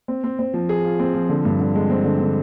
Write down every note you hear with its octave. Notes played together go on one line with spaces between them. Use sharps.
C4
C4
C4
F3
G#4
F4
C4
F3
D3
G2
D3
G#3
C4
D3
D3